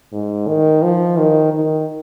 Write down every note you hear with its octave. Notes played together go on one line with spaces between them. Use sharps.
G#2
D#3
F3
D#3
D#3